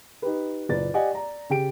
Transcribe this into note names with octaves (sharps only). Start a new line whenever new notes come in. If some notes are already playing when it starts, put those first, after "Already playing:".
D#4 G4 B4
F#1 A#2 B4 D5 A6
G4 D5 D#5 F#5 G#5
D5 A#5
C#3 G4 G5 D7